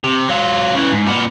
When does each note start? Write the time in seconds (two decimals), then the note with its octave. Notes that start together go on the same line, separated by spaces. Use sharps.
0.04 C3
0.28 F#3 F4
0.75 C#3 E3
0.92 G#2
1.07 A#2 B3